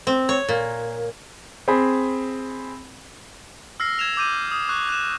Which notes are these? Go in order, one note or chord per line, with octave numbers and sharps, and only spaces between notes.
C4
C#5
A#2
C4 G#4 B5
E6 F6 A#6 C7
G#6 E7 F7
D6 G6 D#7
D#6
C#6 F#6
F#6 E7